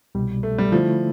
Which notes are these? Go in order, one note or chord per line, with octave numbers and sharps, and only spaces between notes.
C2 B2 G3
A3
G3
D3 F3 A3 E4